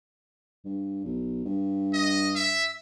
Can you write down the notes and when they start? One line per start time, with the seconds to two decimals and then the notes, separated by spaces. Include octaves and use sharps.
0.65 G2
1.05 B1
1.45 G2
1.93 D#5
2.35 E5